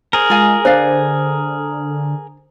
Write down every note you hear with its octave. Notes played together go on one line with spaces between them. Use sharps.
G#4 A#4 C5
G#3 F4 F5 G#5
D3 D4 C5 D5 F5